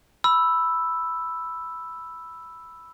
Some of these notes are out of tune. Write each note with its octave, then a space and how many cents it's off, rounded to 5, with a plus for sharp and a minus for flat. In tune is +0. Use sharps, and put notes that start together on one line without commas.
B5 +0 E6 +0